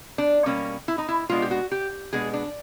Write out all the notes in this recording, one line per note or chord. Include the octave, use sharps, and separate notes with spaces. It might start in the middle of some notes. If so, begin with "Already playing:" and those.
D4
B2 G3 A#3 C#4
E4
D#4
E4
B2 G#3 B3 D4 F4
G4
F#4
G4
B2 G#3 B3 D4 G#4
D4